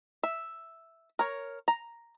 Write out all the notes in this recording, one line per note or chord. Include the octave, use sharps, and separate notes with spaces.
E5
A#4 C#5
A#5